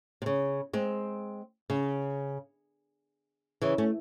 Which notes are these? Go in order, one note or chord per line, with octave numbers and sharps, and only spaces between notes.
C3
C#3
G#3 C4
C#3
C#3 E3
A3 C#4